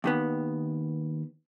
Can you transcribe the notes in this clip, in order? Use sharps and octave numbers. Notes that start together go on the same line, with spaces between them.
D#2 D#3 B3